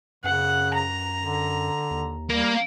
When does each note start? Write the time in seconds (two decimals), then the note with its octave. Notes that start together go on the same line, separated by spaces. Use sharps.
0.24 F#2 C#3 F#5
0.73 A#5
1.22 D3
1.91 D#2
2.30 G3 A#3 A#4